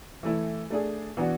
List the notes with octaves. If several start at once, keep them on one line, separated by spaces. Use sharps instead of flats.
E3 A3 E4
A3 D4 G#4
E3 B3 D4 F#4